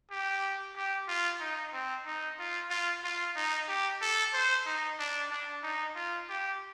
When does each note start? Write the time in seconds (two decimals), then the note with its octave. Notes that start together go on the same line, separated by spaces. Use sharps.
0.11 G4
0.76 G4
1.08 F4
1.41 D#4
1.72 C4
2.06 D#4
2.39 F4
2.70 F4
3.04 F4
3.36 D#4
3.68 G4
4.01 A4
4.34 C5
4.66 D#4
4.99 D4
5.31 D4
5.63 D#4
5.96 F4
6.29 G4